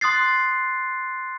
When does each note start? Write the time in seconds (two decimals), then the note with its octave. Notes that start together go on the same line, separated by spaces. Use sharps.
0.01 C6 D#6 F#6 A6 C7